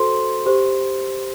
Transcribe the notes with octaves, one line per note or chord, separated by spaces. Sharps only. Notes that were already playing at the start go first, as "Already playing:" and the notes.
Already playing: F#4 A4 C5 C6
G4 C5